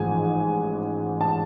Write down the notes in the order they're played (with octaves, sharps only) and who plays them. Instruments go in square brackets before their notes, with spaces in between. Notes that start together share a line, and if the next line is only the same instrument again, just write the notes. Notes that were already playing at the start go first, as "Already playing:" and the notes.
Already playing: [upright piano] A1 G#2 F3 G#3 G#5
A5